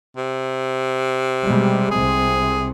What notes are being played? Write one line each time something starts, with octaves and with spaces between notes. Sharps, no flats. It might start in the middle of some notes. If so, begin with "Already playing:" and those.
C3
B2 G3 G#3
C2 C3 G#4